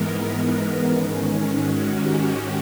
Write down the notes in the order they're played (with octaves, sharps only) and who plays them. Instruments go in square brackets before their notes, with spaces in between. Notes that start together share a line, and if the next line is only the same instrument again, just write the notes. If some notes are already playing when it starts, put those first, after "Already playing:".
Already playing: [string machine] G#2 E3 G#3 B3 A#4
G#2 D#3 G#3 C#4 A4
F#4
G4